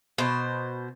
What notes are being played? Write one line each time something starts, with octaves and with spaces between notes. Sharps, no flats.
B2 C5